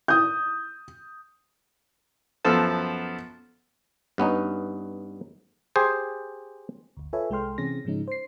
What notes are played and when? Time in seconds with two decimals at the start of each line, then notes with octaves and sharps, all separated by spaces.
0.08 D#6 G6
2.45 F#2 F3 B3 A4 C5 A5
4.18 G2 B3 C#4 D#4
5.76 G4 G#4 C5
6.97 G1 D2
7.13 F4 A4 B4 C#5 E5 G#5
7.30 C2 G#3 A4 G5 C6 F6
7.58 C3 E3 C4 C#4 G#4 A#6
7.85 G#2 C#3 F3 G#3 C#4 D#4
8.08 C5 C7